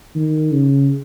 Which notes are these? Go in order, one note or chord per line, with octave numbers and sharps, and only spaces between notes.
D#3
C#3